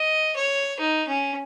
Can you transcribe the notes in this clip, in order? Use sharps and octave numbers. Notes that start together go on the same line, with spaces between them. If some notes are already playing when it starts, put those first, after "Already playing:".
Already playing: D#5
C#5
D#4
C#4